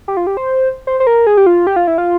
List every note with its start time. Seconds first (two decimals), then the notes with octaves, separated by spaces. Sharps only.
0.08 G4
0.17 F4
0.27 G4
0.37 C5
0.87 C5
1.00 C5
1.07 A#4
1.27 G#4
1.37 G4
1.46 F4
1.67 G4
1.76 F4
1.87 E4
1.98 F4